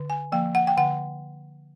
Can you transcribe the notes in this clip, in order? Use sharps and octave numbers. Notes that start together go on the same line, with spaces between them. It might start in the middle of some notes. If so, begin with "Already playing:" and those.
Already playing: D3
G#5
F3 A#3 G5
F#5
G5
D3 F#5